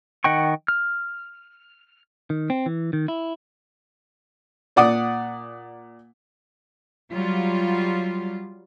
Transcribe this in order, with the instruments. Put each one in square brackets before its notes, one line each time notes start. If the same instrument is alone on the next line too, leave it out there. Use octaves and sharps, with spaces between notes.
[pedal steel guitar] D#3 D#5 F#5 G5 C#6
F6
[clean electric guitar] D#3
C4
E3
D#3
E4
[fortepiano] A#2 D5 F#5 D6 D#6
[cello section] F#3 G3 F4